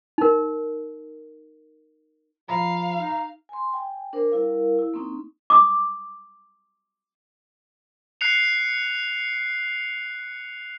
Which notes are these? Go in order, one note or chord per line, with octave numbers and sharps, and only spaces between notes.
D#4 A#4
F3 F5 A#5 B5
D#4
G#5 C6
G5 G#5
D4 A#4 C5
G3 E4 A#4 F5
E4
A#3 C4 C#4 D#4
D6 D#6
F#6 C7 C#7 F7